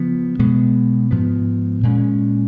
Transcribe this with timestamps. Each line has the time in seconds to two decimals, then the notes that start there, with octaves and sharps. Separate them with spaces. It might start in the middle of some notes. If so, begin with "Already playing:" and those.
Already playing: C#3 F3 B3
0.39 B2 G#3 B3
1.11 G#2 F3 B3
1.83 A#2 G#3 C#4